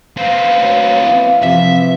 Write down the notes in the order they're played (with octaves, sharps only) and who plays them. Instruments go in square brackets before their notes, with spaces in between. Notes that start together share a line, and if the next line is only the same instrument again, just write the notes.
[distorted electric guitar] B3 C4 [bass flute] F5
[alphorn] F#3
E3
[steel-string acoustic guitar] C3 F3 [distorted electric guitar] E5